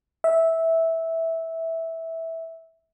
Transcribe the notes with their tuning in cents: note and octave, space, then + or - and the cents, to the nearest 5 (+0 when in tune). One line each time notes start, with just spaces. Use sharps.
E5 -10